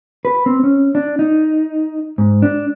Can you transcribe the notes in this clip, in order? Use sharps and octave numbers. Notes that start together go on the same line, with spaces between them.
B4
C4
C#4
D4
D#4
G#2
D4